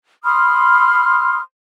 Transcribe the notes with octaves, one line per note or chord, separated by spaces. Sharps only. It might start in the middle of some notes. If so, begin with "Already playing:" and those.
B5 C6 D#6 F6